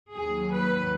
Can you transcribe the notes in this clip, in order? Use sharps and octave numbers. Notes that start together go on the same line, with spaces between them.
D#2 D#3 F#3 G#4
B4